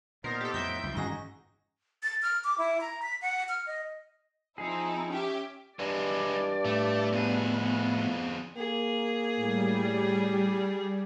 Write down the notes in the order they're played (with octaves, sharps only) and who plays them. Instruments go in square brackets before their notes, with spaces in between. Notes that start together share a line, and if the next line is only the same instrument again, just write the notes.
[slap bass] A#2 [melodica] B3 D#4 C5 [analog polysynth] A#4
[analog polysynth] G4 A4
[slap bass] F2 A2 [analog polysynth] E5 G5 G6
[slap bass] C#2 F3
[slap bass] G2 D#3 C#4 [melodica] D#4 F#4 G#4 [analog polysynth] A#6
[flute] A6
F6
D6
E4
A#5
B6
F#5
F6
D#5
[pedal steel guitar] F3 G#4 [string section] C4 D#4 E4
[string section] C#4 G4 E5
[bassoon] G2 [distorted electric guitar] E3 G#3 [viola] D5
[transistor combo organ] A2 [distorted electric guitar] A3
[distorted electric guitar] F2 G#4 [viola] B3
[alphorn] A#3 [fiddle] G#4
[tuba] A2 [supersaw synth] G3